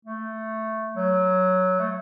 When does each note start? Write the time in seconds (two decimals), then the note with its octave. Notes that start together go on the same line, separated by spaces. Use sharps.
0.05 A3
0.96 F#3
1.79 A3